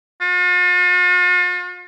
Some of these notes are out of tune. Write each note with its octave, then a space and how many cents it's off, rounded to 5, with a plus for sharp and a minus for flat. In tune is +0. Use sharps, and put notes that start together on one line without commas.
F4 +45